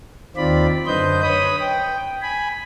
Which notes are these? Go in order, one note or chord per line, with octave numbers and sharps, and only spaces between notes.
D#2 D#3 C4 F4 D5 B5
F#2 D3 B4 C5 D#5 G6
B4 C#5 B5 D#6
G5
G#5 B5